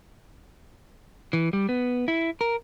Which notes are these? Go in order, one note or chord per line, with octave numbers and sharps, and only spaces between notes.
E3
G3
B3
E4
A#4